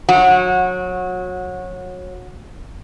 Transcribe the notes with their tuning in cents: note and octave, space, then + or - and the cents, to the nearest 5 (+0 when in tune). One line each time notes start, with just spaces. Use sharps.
F#3 -25 F#4 -20